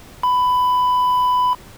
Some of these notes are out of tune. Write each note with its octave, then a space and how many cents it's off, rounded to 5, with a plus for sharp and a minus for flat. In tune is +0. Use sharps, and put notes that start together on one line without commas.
B5 +15